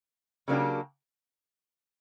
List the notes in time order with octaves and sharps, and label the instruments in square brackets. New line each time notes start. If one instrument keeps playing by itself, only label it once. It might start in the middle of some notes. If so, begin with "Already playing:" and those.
[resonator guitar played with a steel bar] C#3 F#3 A#3 D4 G4